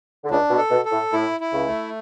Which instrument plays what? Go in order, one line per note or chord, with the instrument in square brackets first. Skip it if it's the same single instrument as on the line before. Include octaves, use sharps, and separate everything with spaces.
[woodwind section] D3
[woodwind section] C#2 C#3 [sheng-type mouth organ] D4
[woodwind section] B2
[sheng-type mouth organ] A4
[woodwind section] B2
[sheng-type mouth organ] A4
[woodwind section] A2
[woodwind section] A2 [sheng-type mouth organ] E4
[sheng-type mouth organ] E4
[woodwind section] C#2 C#3
[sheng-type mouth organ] A3